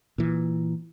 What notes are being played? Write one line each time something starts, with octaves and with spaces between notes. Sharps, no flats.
A#2 E3